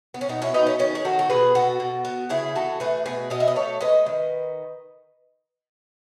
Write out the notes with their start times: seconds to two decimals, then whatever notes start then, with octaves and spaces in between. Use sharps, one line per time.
0.14 B3
0.21 C#4
0.29 B2 B3 D#4
0.42 C#4 E4
0.54 B2 B3 D#4
0.67 C#4
0.79 D#3 C#4
0.95 G#4
1.05 D#3 F#4 A4
1.19 A4
1.30 B2 G#4 B4
1.55 B2 F#4 A4
1.80 B2
2.05 B3
2.29 C#3 E4 G#4
2.55 E3 F#4 A4
2.80 A3 G#4 B4
3.06 B2 G#4 B4
3.30 B2 B4 D#5
3.40 E5
3.48 D#5
3.56 A3 A4 C#5
3.81 G#3 B4 D#5
4.06 D#3